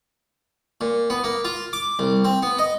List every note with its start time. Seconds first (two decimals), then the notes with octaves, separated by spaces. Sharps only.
0.81 A#2
1.10 B3
1.24 A#3
1.45 F4
1.73 D6
1.99 C2
2.25 C4
2.42 B3
2.58 D#5